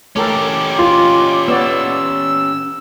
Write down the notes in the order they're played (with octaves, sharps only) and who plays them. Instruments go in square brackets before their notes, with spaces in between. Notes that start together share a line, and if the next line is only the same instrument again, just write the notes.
[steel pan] A3 A4 A#4 [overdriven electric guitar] C#4 G4 [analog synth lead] D6
[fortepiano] F4
[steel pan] B3 C#5 D5 [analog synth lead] E6